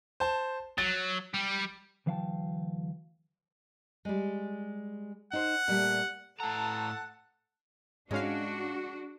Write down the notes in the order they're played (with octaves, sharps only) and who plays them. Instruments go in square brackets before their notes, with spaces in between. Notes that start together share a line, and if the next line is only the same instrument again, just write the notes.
[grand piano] C5 A5
[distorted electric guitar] F#3 [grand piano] A6
[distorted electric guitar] G3
[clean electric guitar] D2 E3 F#3 F5 G5 A5
[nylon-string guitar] G3 G#3
[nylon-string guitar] D#4 C5 [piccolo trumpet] F#5
[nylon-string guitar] A#2 G3 A3
[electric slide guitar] A2 A#5 [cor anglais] A4 [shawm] F#5 [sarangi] A5
[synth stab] G#2 C#4 F5 [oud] G#3 [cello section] D4 F#4